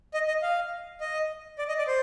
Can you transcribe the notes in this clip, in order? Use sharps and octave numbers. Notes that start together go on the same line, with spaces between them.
D#5
D#5
F5
D#5
D5
D#5
D5
C5